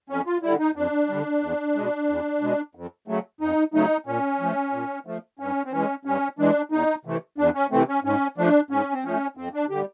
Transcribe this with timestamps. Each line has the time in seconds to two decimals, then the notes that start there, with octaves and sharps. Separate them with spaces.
0.09 F2 C#4
0.26 F4
0.42 D3 G3 E4
0.59 D#4
0.75 F2 D4
1.09 D3 G3
1.42 E2
1.75 B2 G#3
2.08 E2
2.42 B2 G#3
2.75 F2
3.08 C#3 F#3 A3
3.41 F2 D#4
3.74 C#3 F#3 A3 D#4
4.06 A#2 C#4
4.40 F3 A3
4.73 A#2
5.06 F3 A3
5.39 G2 C#4
5.65 C4
5.72 E3 G#3 C#4
6.05 G2 C#4
6.39 E3 G#3 D4
6.72 E2 D#4
7.05 C3 E3 A3
7.38 E2 D4
7.55 C#4
7.71 C3 E3 A3 C4
7.88 C#4
8.04 G#2 C#4
8.37 F3 A3 D4
8.70 G#2 C#4
8.93 C4
9.04 F3 A3 C#4
9.37 F2 C4
9.54 D4
9.70 D3 G4
9.75 G3